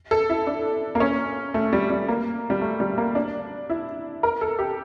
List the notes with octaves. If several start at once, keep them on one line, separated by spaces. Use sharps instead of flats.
A4
E4
D4
A#3
C#4
A3
G3
G3
A#3
G3
A3
G3
A#3
D4
E4
A#4
A4
G4